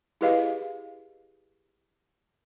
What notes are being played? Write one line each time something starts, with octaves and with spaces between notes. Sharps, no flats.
E4 G4 G#4 B4 D#5 F5